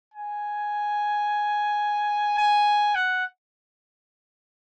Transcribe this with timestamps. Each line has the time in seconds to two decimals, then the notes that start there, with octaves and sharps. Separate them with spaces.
0.14 G#5
2.38 G#5
2.95 F#5